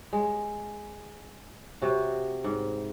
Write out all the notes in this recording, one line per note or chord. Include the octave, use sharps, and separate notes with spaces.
G#3
C3 F#4
G#2